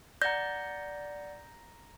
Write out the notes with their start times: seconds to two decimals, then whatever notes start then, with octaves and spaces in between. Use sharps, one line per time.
0.22 D5 F#5 A#5 G6 A#6